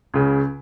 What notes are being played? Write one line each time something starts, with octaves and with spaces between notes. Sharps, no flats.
C#2 C#3